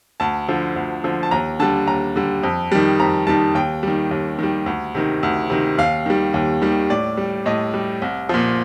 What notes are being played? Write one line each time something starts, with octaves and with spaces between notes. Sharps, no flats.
D2 A5
D3 F3
D2
D3 F3
A5
D#2 A#5
D3 G3 A5
D#2 A#5
D3 G3
F2
D#3 G3
F2 A#5
D#3 G3 A5
D#2 G5
D#3 G3
D#2
D#3 G3
D2
C3 D#3
D2
C3 D#3
D#2 F5
D#3 G3
D#2
D#3 G3
A2 D5
G3
A2 D#5
G3
C2
A#2 F3